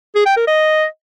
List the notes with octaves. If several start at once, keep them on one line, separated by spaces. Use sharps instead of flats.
G#4
G5
A#4
D#5